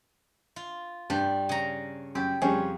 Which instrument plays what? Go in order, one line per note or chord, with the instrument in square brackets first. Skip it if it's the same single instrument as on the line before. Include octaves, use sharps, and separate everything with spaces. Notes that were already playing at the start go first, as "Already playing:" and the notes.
[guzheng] F4
[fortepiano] G2 [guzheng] G3
[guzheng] C#3 A#5
[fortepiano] F#2 [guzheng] G4
[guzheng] F2 [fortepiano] G3 C#4 G#4